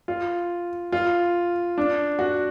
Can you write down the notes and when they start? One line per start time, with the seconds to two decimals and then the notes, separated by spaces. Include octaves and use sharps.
0.08 F4
0.92 F4
1.78 D4
2.19 F#4